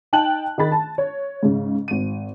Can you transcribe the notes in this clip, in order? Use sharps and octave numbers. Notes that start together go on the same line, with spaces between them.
D#4 G5 A5 F#6 F#7
D#3 G#4 B5 A6
A5
C#5
G#2 C#3
G#1 D#7